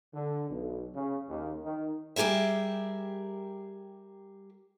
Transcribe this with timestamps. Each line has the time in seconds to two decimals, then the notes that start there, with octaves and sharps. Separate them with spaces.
0.14 D3
0.50 B1
0.94 C#3
1.29 D#2
1.63 D#3
2.16 G3 G4 G#4 A#4 E5